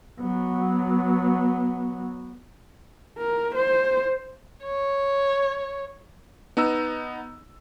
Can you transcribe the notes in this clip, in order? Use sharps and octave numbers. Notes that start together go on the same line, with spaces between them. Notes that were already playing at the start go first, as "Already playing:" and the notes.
F#3 B3
A#4
C5
C#5
B3 D#4 A#5 E6